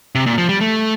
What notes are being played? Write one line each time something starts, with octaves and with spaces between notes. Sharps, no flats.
C3
A#2
F3
G3
A3